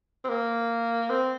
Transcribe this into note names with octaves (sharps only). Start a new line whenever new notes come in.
C4
A#3
C4